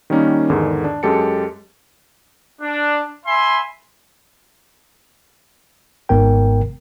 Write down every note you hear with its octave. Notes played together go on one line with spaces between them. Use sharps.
D#3 G3 A#3 C#4 D#4
E2 G#2 D3 D#3
D4
F#2 G#3 G4 A4 A5 C#7
D4
E5 G#5 B5 C6
G#1 G#2 B3 A#4 G5